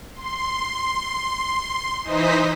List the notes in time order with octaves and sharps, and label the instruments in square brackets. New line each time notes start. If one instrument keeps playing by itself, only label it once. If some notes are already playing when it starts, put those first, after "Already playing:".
[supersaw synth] C6
E3 D#4 C5 D#5 B6